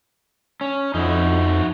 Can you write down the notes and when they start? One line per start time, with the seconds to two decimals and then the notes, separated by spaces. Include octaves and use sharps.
0.61 C#4
0.94 F2 D#4 E4 F#4